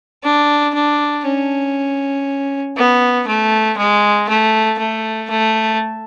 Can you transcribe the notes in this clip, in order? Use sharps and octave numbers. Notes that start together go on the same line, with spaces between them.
D4
D4
C#4
B3
A3
G#3
A3
A3
A3